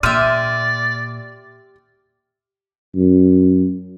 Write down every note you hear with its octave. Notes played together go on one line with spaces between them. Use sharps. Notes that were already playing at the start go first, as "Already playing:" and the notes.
A#2 G4 D5 E5 C6 F6 D#7
F#2